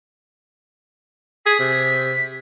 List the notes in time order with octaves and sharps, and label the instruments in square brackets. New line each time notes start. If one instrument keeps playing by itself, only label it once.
[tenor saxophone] G#4 [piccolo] B6
[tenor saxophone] C3